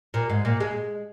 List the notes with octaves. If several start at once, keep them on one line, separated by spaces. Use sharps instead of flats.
A#2
G#2
A#2
G#3